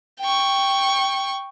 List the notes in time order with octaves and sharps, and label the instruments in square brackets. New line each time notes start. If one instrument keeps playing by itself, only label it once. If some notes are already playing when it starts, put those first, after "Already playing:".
[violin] G5 C#6